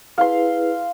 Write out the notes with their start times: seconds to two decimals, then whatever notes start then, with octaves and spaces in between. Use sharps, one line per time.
0.18 E4 G#4 B4 F5 C6